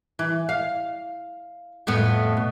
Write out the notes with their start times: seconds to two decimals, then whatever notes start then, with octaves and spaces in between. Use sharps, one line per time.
0.19 E3
0.49 F5
1.87 F2 A2 B3
2.37 B2